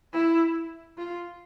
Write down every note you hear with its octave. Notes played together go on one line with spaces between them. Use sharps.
E4
F4